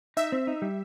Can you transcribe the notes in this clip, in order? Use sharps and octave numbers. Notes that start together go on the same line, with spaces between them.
D#4 E5
C4
D#4
G3